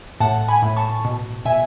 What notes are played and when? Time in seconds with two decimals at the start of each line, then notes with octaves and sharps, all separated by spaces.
0.20 A2 F#5 A5
0.48 G#5 B5
0.62 A2
0.77 A5 C#6
1.05 B2
1.45 B2 E5 G#5